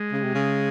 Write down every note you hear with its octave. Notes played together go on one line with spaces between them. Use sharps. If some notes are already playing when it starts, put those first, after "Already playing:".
Already playing: G#3
C#3
C3
C#3